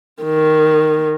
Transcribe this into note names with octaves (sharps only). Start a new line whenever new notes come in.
D#3